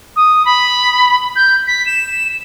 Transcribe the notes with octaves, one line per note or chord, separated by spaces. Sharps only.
D#6
B5
G6
B6
E7